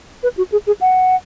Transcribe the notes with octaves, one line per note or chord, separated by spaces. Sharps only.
B4
F#4
G#4
G#4
F#5